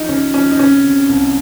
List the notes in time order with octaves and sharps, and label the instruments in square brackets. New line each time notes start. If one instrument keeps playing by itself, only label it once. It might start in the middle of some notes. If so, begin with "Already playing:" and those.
Already playing: [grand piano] F3 D#4
C#2 C#4
F3 C#4
D#4
C3 C#4
C3
C2